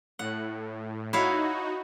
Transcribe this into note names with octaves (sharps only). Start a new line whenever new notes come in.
A2 F#5
D#4 E4 F#4 C#5 F5